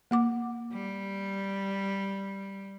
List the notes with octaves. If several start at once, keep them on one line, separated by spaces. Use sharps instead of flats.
A#3 F#5 D6
G3